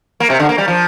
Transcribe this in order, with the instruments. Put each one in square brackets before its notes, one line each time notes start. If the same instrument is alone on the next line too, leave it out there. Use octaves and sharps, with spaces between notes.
[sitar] A#3
C3
D3
A#3
G3
F3